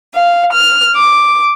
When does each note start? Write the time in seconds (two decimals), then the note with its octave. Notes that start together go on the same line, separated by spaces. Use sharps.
0.14 F5
0.51 F6
0.96 D6